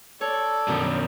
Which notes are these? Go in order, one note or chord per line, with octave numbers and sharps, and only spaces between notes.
A4 C#5 D5
F#2 B2 D#3 F3